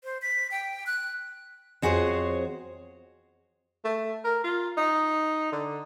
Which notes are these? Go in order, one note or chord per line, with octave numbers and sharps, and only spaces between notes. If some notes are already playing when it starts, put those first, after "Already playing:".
C5
B6
G5
F#6
F2 F#4 G#4 C5 C#5
A3
A#4
F4
D#4
D3